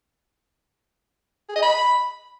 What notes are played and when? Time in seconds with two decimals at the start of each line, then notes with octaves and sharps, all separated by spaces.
1.49 G#4
1.56 D#5
1.62 B5